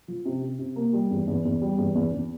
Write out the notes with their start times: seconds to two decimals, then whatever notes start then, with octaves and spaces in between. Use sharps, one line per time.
0.08 F3
0.25 C3
0.42 C3
0.59 C3
0.76 A#3
0.93 G3
1.11 E2
1.27 E2
1.45 E2
1.62 G3
1.78 E2
1.95 E2
2.12 E2